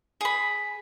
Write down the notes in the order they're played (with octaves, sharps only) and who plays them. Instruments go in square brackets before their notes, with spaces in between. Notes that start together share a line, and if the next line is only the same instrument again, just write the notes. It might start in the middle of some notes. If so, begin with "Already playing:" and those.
[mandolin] G#4 B5